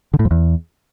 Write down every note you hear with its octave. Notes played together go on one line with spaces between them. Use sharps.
D3
A2
F2
E2